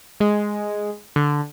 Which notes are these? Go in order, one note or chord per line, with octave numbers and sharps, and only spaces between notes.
G#3
D3